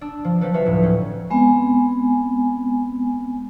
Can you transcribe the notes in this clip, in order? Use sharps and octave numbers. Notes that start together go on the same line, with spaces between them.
D4 E6
F3
F3 F#3 C4 A4 B4
C#4 F4 F#4 B4 E5
D2 A2
C4 C#4 B4
G#3 B3 C4 G#5